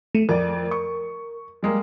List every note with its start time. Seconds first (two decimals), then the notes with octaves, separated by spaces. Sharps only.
0.15 A3 D#7
0.29 F2 A#4 D5
0.71 C#6
1.63 G3 G#3 A#3